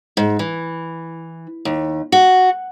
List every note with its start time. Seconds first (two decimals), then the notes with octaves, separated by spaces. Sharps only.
0.17 G#2
0.39 E3
1.65 D#2
2.12 F#4